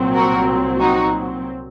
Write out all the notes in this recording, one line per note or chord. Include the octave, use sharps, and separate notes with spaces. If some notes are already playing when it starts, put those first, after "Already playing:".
Already playing: C2 A#2 F#3 C4
F#4 A#4
D#4 F#4